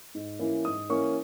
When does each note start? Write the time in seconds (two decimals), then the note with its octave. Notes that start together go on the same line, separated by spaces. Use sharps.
0.15 G#2
0.39 E3 A#3 C#4
0.65 G#2 D#6
0.90 E3 A#3 C#4 C#6